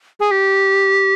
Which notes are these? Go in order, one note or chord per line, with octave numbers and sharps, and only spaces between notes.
G#4
G4